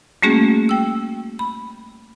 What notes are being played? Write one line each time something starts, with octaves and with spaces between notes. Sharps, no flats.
G3 A3 A#3 C#4 F#4 G#4
G5 E6
B5